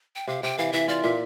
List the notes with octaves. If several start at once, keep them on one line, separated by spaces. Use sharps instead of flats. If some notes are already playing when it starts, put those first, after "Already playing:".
G5
C3 F5
C3 G5
E3 F5
E3 E5
F4 D5
A#2 E5